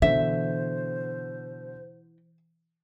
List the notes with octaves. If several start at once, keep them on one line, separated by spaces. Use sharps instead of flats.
B2 D3 E3 C5 E5